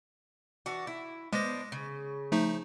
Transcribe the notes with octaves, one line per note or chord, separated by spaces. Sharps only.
E3 D4 F#4
E4
G#3 B3 D4 C5 A#6
C#3
F3 A3 D#4